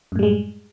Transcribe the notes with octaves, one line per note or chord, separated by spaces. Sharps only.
F#2 A2 G3 G#3